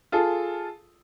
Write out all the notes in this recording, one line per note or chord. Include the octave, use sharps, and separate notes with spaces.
F4 G#4 A4